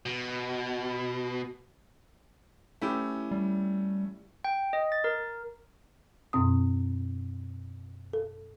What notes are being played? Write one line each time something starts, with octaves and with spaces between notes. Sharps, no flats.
B2
A3 C#4 E4 G4
G3
G5
D#5
A6
A#4
F#2 B2 C4 D#6
A4